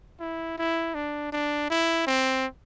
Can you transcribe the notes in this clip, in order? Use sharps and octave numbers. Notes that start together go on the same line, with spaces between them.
E4
E4
D4
D4
E4
C4